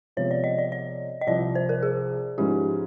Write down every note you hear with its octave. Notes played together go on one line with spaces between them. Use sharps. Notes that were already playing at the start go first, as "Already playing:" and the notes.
C3 F3 G#3 B3 C#5
D5
D#5
D5
D5
D#5
C2 C3 F3 D5
C5
A#4
G#4
G#2 F3 G#3 C#4 E4 G4